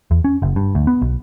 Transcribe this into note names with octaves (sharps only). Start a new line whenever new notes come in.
E2
C#4
F#1
G2
D2
B3
B1